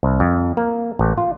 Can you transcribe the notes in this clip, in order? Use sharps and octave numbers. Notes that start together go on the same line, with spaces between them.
C2
F2
A#3
A1
F4